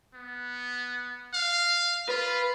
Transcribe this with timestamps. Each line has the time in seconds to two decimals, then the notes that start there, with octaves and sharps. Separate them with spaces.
0.14 B3
1.34 F5
2.09 F4 B4